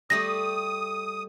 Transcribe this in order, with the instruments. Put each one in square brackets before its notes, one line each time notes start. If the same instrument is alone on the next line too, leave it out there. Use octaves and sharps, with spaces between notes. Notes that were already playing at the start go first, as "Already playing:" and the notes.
[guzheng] G3 A3 G4 [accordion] D#6 [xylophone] A#6